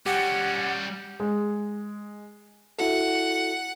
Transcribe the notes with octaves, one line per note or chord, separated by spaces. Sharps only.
G3 C#4 G4 F#5
G#3
E4 F#4 A4 F#5